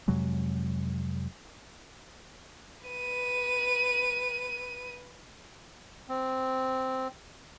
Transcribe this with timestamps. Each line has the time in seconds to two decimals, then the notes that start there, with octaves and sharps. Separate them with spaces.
0.08 F2 C3 F#3 G#3
2.86 B4 D#7
6.09 C4